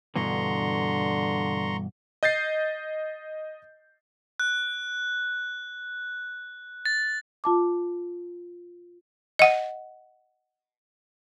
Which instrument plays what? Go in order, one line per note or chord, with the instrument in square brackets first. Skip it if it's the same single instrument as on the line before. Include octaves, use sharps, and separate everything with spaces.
[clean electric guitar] G2 B2 E3 [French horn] D3 [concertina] A#5 C6 C#6
[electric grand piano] D#5 G6 A6 C7
[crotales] F#6
A6
[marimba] F4 A5 D6
[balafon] D#5 F#5